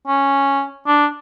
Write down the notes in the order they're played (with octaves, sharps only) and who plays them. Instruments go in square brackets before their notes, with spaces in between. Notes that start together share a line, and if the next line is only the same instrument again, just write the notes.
[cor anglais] C#4
D4